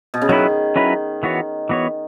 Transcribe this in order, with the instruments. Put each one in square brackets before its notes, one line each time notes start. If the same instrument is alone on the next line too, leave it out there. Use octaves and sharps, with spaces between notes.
[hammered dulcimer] B2
C#3
[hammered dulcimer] D#3 [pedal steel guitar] F#3 C#4 E4 B4
[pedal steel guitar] F#3 C#4 E4 B4
E3 B3 F#4 C#5
E3 B3 F#4 C#5